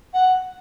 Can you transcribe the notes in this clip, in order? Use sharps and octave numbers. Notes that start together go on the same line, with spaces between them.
F#5